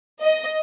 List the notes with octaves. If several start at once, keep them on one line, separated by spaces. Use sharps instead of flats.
D#5